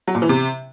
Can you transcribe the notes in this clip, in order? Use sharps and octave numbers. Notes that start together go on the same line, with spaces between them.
F#3
A#2
E3
C3